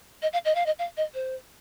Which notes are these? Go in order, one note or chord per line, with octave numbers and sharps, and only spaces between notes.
D#5
F5
D#5
F5
D#5
F5
D#5
C5